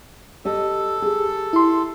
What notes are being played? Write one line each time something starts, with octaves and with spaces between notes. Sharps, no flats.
G4 A4 D#5
G4 G#4
E4 C6